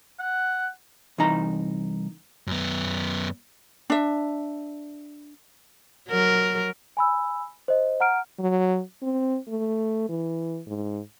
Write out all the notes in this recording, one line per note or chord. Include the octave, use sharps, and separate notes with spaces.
F#5
C2 E3 D#4 A#5
F#2 B3
D4 E5
F#3 A#4
G#5 B5 E6
C5 D#5
F#5 A#5 F6 D7
F#3
C4
A3
E3
G#2